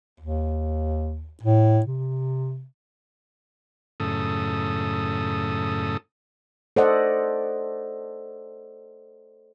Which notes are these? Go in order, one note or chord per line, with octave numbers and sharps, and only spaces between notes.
D#2
A2
C3
F#2 A2 C#3 A4 D#6
A4 C5 D5 D#5 F#5